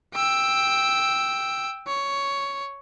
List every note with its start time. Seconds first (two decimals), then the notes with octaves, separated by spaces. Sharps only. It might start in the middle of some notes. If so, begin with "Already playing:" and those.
0.14 G5 E6
1.87 C#5